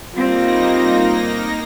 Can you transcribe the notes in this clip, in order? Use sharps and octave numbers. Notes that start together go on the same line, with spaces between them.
G3 A#3 C4 D#4 F4 A#6